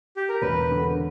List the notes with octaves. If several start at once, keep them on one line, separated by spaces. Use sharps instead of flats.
G4
A#4
E1 B4
D3